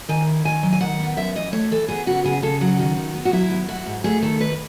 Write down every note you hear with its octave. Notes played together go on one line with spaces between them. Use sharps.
D#3 G#5
E4
D#3 G#5
F#3
G#5
D#3 F#5
B3
F#2 E5
E3 D#5
A3 C#5
E3 A4
B3 G#4
C#3 F#4
C#3 G#4
C#3 A4
F#3 F#4
D#3
D#3
B3
F#4
F#3 E4
B3
E4 F#4
G#2
A3 G#4
D#3 A4
D#3 B4